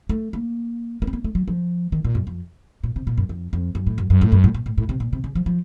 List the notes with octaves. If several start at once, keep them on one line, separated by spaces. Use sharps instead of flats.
A3
A#3
A#3
C4
A#3
A3
F#3
F3
D#3
A#2
F#2
F2
A#2
C3
A#2
F#2
F2
F2
F#2
A2
F#2
F#2
A2
F#2
A2
A#2
A2
A2
C3
A#2
C3
C#3
F3
F3